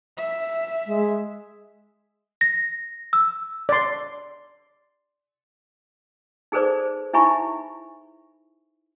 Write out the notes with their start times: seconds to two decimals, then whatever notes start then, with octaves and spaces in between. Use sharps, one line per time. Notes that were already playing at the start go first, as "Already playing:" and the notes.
0.17 E5
0.87 G#3
2.41 A#6
3.13 E6
3.69 D5 C6
6.52 D#4 G#4 A4 B4 C5 D5
7.14 D#4 E4 E5 G#5 B5 C#6